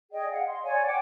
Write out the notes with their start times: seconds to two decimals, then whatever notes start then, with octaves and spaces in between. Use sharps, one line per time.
0.12 G#4 D5 D#5 G5
0.31 F5 F#5
0.46 C6
0.63 C#5 D5 G#5
0.85 F#5 G5 D6